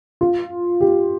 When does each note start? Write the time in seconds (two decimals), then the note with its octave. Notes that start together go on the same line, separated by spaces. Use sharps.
0.21 F4
0.81 G4